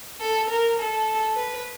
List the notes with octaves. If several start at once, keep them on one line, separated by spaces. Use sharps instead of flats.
A4
A#4
A4
B4